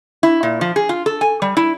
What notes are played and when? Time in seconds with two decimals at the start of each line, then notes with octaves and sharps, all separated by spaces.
0.23 E4
0.43 A#2
0.61 F3
0.76 G#4
0.89 F4
1.06 A4
1.21 G#5
1.42 G3
1.57 E4